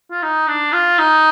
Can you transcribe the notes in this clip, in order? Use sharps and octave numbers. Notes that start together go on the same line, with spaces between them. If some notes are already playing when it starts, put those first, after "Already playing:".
F4
D#4
D4
F4
D#4